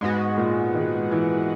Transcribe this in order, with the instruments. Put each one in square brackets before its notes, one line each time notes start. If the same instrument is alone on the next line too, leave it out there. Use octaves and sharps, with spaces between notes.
[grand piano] G#2 [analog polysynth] G#3 B3 F#4
[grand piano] A#2
D#3
E3